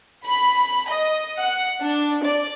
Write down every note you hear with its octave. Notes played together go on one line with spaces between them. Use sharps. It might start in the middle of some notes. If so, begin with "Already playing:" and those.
B5
D#5
F#5
D4
D5